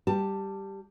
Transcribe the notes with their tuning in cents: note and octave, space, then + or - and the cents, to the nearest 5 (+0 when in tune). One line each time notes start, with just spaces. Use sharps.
G3 +0 G4 +0 A5 +15